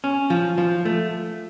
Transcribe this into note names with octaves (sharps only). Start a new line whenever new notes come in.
C#4
F3
F3
A3